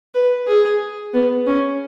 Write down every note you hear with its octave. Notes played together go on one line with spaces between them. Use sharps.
B4
G#4
B3
C#4